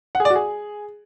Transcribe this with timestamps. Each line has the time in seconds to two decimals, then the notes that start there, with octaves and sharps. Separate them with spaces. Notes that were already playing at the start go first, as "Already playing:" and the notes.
0.15 F#5
0.20 G#4
0.25 D5
0.30 F#4
0.36 G#4